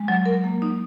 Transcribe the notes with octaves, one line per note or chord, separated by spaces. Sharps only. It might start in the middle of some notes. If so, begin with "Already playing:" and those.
Already playing: G#3
F#3
A#4
A#3
D#4